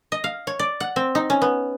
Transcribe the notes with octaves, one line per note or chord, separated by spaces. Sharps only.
D#5
F5
C#5
D5
F#5
C4
D#4
C#4
B3